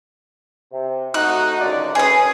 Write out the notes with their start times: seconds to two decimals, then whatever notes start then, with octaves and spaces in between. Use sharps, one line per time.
0.71 C3
1.14 A3 D#4 F#4 F#6
1.60 C#2 F#2 D3 D5
1.95 D#3 G#3 C#4 G#4 B4 D#6